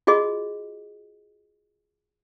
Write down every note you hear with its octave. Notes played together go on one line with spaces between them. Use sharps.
F4 F#4 G#4 D#5